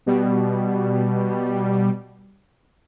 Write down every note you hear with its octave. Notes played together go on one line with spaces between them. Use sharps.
B2 G3